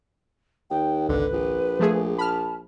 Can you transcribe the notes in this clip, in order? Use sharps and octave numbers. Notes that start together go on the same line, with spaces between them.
D#2 G5
G#1 C#2 D3 B4
A#1
F3 A3 G#4
A5 B5 F6